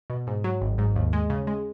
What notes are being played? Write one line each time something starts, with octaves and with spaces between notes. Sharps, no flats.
B2
G#2
F#3
G#1
G#2
D#2
G#3
C#3
G#3